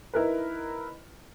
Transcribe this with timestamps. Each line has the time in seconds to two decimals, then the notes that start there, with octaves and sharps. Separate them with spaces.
0.14 D#4 E4 A#4 B4